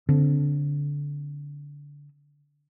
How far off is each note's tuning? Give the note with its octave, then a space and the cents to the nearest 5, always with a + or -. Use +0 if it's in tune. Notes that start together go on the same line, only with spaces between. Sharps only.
D3 -20 C4 -15